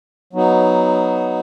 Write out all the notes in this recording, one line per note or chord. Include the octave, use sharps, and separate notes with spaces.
F#3 B3 D#4